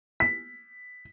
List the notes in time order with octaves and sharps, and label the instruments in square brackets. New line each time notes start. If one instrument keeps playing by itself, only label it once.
[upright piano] B6